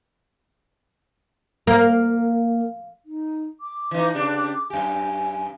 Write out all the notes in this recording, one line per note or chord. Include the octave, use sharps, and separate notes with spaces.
A#3
D#4
D6
E3 D#4
C#3 D4 G4
F#2 G4 G#5